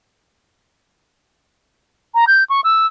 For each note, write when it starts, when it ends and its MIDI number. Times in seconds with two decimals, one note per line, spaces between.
2.14 2.25 82
2.27 2.44 91
2.49 2.61 85
2.64 2.86 88